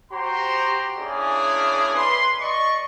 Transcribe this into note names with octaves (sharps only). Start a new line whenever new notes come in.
F#4 G4 C5 A#5 C6
A#3 C#4 D4 E4 G#4 D5
B4 C6
D5 D#5 C#6